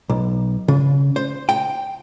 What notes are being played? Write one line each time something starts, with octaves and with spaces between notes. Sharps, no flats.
B1
C#3
C5
G5